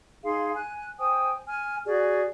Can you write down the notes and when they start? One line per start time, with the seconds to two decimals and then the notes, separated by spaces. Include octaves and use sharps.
0.23 D#4 G#4 F5 C6
0.54 G#5 F#6
0.99 C5 G5 G#5 D#6
1.48 G#5 F6
1.86 F#4 G#4 D5